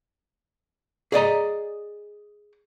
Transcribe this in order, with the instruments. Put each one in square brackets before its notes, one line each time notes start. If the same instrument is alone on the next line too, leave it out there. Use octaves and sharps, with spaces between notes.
[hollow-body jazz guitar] G#4 D5 D#5 A#5